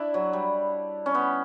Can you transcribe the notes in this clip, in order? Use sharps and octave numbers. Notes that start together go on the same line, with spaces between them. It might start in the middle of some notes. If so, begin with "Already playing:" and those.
Already playing: D4 E4
F#3
G3
C#4
B3